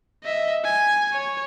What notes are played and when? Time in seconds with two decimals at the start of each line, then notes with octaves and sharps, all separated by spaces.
0.24 D#5 E5
0.65 G#5
1.13 C#5